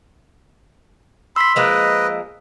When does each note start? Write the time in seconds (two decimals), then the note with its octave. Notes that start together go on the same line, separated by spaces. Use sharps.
1.36 B5 C6 E6 B6
1.56 F3 G#3 A#3 B4 D#5